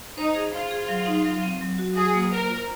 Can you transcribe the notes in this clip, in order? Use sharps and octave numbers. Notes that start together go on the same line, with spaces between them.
D#4 C5
G#4
F4 C5
G#4
F#3
D#4
F#3
C4
F#3
F#4
F#3 G#4
A#3
A#4 C5
F4